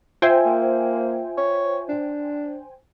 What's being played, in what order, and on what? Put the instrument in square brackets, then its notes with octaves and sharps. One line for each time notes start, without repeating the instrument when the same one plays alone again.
[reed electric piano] F4 E5 [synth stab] C5 G5 G#5
[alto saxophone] A#3
C#5
D4